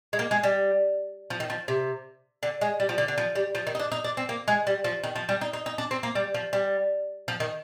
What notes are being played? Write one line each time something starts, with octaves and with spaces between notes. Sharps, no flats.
G#3
A#3
G#3
G3
F3
D#3
F3
C3
D3
G#3
G3
F3
D3
D3
F3
G3
F3
D#3
D#4
D4
D#4
D4
C4
A#3
G#3
G3
F3
D#3
F3
G3
D#4
D#4
D#4
D4
C4
A#3
G3
F3
G3
F3
D#3